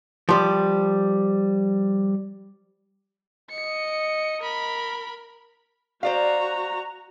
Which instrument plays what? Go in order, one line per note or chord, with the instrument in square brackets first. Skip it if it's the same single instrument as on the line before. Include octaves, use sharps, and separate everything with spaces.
[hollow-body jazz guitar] F3 G3
[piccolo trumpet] D#5 [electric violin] C#7
[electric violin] A#4 B5
[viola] F#4 A#5 [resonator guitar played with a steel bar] C5 D5 F5